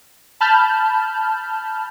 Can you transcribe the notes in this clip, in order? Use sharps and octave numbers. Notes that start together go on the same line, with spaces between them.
A5 B5 F6 G6